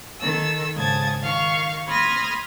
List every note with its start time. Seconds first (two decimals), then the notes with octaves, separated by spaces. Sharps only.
0.20 D#3 A4 E6
0.74 G#2 C#3 A5 D#6 G#6 A6
1.22 D#3 F5 C#6
1.87 B5 C6 D#6 F6 G#6 A#6